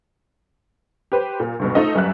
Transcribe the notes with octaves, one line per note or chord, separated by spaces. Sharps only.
G4 B4 C5
A#2
D2 G2 B2
A3 D#4 F4 A4 C5 D#5
G1 F#2 G3 E5 F#6